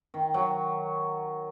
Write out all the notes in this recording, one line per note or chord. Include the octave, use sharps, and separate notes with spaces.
D#3
F#3